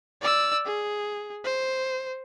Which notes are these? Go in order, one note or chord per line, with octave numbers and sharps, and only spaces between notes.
D5 E6
G#4
C5